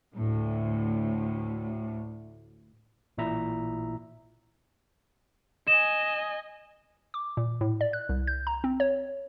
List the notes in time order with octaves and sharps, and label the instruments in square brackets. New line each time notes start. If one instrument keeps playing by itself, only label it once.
[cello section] D2 A2
[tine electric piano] A1 A#2 E4 E5 A#5
[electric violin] D#5 G#5 [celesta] E7
[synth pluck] D6
A#2
A2
D5
F#6
C2
G6
A#5
C4
C#5